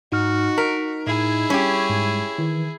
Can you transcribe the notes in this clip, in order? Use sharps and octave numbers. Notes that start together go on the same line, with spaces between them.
G#2 D#4 F#4 F6
A#4 B6
A2 E4 G#4
G3 C#4 G4
G#2
D#3 E3